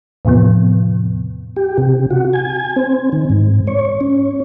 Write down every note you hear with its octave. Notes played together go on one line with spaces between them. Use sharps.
E2 A2 C3 F3 B3
G4
C3
F#4
G#5
C4
D#3
G#2
C#5
C#4